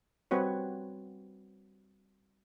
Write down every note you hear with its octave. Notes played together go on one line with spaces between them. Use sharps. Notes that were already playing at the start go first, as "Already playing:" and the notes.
G3 C4 F#4 B4 C#5